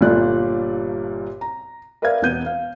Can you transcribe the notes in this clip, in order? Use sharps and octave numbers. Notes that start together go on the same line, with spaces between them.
G1 G2 A#2 A4 D5 F#6
A#5
A#4 B4 D5 E5 F5 G#6
E1 B3 G6 D#7
F5